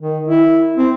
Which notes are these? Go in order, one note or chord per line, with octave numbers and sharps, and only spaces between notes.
D#3
E4
C4